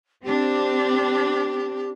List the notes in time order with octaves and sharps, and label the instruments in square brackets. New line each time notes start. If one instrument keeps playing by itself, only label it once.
[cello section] C4 D4 [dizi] G4